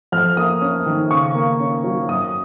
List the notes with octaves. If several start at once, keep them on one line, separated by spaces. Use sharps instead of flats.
F2 F6
A#3 D#6
C#4
D#3
C#3 C#6
A#3
C#4
F#3
F#2 D#6